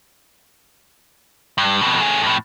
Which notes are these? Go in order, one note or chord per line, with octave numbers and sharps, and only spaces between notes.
G2
F2 B2
A3 G#4
F2 A2